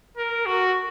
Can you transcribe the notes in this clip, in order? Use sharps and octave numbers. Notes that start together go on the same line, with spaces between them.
A#4
F#4